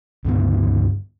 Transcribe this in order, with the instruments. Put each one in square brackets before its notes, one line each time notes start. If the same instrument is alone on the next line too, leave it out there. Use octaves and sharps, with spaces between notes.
[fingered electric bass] C#2 G2 D3 B3